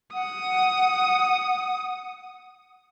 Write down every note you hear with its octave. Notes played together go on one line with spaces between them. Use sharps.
F#5 D#6